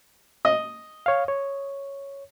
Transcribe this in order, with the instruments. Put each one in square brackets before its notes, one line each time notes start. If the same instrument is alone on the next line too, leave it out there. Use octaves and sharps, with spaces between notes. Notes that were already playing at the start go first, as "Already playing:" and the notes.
[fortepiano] D#5
[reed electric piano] C#5 F5
C#5